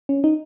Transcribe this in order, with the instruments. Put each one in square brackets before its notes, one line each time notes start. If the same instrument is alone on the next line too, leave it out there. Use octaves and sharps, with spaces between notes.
[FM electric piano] C#4
D#4